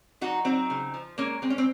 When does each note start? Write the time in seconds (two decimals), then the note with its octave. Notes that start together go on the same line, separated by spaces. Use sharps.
0.21 F#3 D#4 F#4
0.45 F#3 C4 D#4
0.70 C#3
0.94 F3
1.18 G#3 A#3 C#4
1.42 G#3 C4
1.50 C#4
1.58 C4